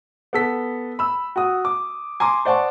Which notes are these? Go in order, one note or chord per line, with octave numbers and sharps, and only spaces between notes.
B3 A4 B6
B5 E6
F#4 F#5 D#6
D6
G#5 A#5 C6 D6
C5 D5 F#5 A5 C#6